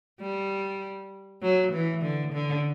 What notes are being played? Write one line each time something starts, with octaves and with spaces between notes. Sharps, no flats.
G3
F#3
E3
D3
D3